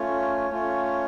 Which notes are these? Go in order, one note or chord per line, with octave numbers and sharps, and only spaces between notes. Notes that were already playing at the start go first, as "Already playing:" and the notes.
Already playing: A3 C#4 F4 C#5
A3 C#4 F4 C#5